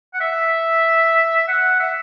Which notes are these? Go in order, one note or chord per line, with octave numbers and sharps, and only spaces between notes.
F#5
E5
F#5
E5